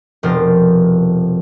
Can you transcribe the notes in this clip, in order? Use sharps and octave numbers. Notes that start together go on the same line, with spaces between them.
F1 B2 F3 A#4 C5 A6